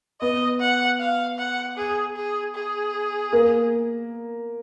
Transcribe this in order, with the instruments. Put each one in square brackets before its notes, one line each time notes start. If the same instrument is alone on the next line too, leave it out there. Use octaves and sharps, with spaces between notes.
[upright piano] B3 [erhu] D#5
[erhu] F#5
F5
F#5
G#4
G#4
G#4
[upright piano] A#3